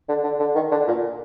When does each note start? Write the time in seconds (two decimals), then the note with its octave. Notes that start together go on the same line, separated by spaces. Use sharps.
0.09 D3
0.24 D3
0.40 D3
0.55 D#3
0.71 D3
0.88 A#2